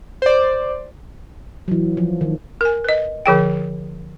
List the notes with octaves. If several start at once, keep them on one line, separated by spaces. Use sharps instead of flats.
C5 D5
E3 F#3
F3
D#3
A#4 G#5
B4 D#5
D3 F3 G#4 G5